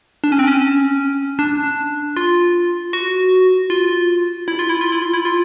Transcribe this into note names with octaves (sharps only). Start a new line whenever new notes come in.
D4
C#4
C4
C#4
D4
F4
F#4
F4
E4
F4
E4
F4
E4
F4
E4
F4